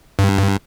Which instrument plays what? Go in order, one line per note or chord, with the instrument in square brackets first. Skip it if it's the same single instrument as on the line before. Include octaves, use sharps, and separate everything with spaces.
[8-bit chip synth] G2